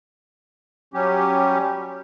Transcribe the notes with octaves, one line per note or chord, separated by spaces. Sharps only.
F#3 G3 C#4 G4